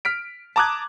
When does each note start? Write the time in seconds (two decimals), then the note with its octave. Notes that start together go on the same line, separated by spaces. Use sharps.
0.05 F6 B6 D7
0.56 A5 A#5 D6 D#6 F#6 G#6